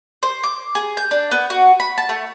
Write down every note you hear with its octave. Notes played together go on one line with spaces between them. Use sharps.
C5
D6
G#4
G6
D4
B3
F#4
B5
A5
A3